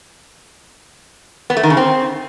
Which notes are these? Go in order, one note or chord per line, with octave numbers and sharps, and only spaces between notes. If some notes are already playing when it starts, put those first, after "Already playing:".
B3
A3
D#3
C#3
C4